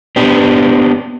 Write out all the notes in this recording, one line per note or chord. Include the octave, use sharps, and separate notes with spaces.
B3 C4 D4 G4